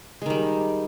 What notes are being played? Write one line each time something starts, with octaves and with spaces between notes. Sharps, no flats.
D#3 G3 G#3